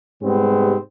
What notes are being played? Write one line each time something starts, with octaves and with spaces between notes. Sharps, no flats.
G#2 C3 G3 G#3 B3 C4